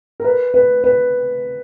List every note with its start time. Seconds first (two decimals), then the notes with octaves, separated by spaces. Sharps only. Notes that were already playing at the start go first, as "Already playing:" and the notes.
0.20 A#4
0.24 B4
0.54 B4
0.84 B4